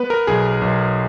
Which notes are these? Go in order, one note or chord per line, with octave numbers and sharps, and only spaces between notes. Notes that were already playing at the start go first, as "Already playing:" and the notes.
Already playing: B3 B4
A#4
B1 G#4
B1